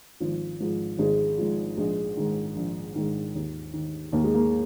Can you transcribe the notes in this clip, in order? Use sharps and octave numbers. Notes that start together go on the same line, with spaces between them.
G#1 F3
G#2 F3
G#1 G#3
G#2 F3
A#1 G#3
G#2 D#3
A#1
G#2 D#3
D#2
D#3
D#2 A#3
G#3
A#3